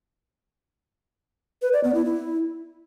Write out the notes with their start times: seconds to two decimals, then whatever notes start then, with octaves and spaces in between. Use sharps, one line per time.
1.62 B4
1.73 D5
1.84 B3
1.94 E4
2.05 E4